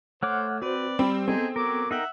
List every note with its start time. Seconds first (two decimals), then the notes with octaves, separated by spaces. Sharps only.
0.23 A3 C5 C#5 F#5 D6 F6 F#6
0.62 C4 F#4 B4 C5 D5
0.99 G3 C4 B5
1.28 B3 C4 D#4 G#4 A4 C5
1.56 F#3 A#4 D6
1.91 D#4 A#4 E5 F#5 G5